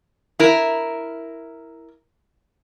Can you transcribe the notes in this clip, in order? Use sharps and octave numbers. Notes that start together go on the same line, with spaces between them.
E4 A#4